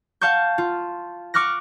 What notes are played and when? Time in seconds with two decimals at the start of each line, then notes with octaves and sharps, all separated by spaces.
0.21 F5 A5 C#6 G6
0.58 F4
1.34 C#6 D6 F6 F#6 A#6